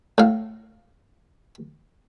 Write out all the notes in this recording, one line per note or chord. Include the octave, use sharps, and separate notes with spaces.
A2 F5